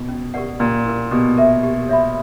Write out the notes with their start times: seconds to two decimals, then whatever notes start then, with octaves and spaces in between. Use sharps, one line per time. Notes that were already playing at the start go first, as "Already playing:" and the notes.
Already playing: B2
0.09 C#4
0.34 G4 A#4 D5 F#5
0.60 A#2 C#4
0.86 E4 A#4
1.11 B2 G4
1.38 A#4 E5
1.63 G4
1.89 C#5 E5 B5